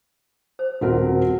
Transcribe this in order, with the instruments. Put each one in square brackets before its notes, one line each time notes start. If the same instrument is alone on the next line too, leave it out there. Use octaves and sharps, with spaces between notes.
[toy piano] C5
[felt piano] D#1 C4 A#4 [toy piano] F#4 F#5